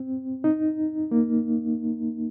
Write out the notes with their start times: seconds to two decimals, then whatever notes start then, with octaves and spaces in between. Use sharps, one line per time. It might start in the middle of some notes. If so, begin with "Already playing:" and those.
Already playing: C4
0.44 D#4
1.11 A#3